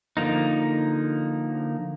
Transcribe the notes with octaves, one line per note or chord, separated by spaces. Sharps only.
D3 F3 A#3 D#4